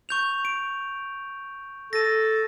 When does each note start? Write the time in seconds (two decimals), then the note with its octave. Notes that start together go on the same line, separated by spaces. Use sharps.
0.09 C#6 G6 F7
0.45 D7
1.93 A4 A#6 D#7